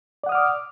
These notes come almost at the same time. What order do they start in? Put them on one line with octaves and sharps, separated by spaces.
D5 F#5 D#6 F6 D6